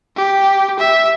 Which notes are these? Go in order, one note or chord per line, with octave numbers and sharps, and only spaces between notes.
G4
E5